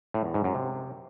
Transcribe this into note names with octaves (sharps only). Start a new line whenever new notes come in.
A2
E2
G#2
F#2
C3